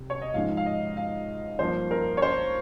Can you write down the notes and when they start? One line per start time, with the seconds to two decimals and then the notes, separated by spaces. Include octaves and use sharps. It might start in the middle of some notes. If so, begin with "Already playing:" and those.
Already playing: C3
0.10 C#5
0.22 D#5
0.34 G#2 F3 G#3 D#4 F5
0.57 F5
0.66 D#5
0.97 F5
1.59 G2 F3 A#3 C5
1.91 A#4
2.17 C#5
2.22 C5